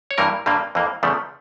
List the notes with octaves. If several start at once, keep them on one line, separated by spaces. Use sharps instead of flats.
C#5
G2 E3 G3 A#3 A#4
G2 D3 G3 A#3
F2 E3 A#3
E2 C#3 F3 A3